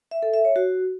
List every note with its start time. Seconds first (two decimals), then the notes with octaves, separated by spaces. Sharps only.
0.11 E5
0.23 A4
0.34 E5
0.45 C#5
0.56 F#4